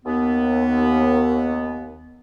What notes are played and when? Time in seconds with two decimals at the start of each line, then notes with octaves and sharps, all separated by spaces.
0.06 D#2 B3